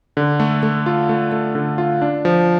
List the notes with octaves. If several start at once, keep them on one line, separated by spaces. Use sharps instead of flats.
D3
A3
A3
F4
A3
A3
D3
F4
D4
F3